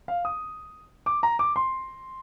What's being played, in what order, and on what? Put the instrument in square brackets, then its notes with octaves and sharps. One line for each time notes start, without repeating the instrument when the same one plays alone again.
[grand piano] F5
D#6
D6
A#5
D6
C6